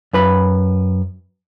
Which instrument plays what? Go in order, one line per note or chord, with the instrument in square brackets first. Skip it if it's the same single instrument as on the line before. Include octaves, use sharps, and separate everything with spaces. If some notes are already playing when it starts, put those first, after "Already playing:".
[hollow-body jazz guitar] F#2 B4 B5